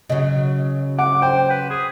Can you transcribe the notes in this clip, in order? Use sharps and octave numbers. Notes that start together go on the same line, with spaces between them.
C#3 F#3 D#5
F#5 D6
C5 G5
B4
G#4